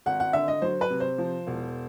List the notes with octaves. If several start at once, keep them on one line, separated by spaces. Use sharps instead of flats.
G#1 F#5
F#5
D3 E5
D#5
F#3 C5
B4
C3
C5
F3
E1